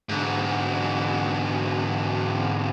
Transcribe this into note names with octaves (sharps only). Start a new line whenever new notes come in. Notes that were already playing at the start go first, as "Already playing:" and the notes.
G#2 D3